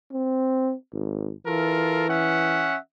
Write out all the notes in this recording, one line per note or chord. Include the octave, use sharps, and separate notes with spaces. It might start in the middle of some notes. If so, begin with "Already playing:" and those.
C4
G#1
E3 F4 A4 A#4
C#4 E5 F#5